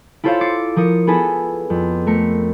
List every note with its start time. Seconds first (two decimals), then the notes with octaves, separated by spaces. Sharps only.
0.24 E4 F4 A4 C5 C#5 F5
0.41 D6 A6 C7 C#7
0.76 F3 A#4 D#6 C#7
1.07 B3 E4 G#4 A4 B4
1.70 F2
2.07 A3 A#4 C#7